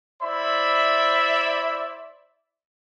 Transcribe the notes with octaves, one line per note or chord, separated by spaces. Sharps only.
E4 C5 D5 E5 B5